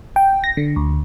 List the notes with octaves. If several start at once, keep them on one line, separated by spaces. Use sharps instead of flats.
G5
A#6
D3
D2